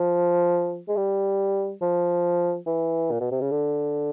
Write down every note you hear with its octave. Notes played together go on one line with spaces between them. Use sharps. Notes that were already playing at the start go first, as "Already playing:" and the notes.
Already playing: F3
G#3
G3
F3
E3
A#2
B2
C3
C#3
D3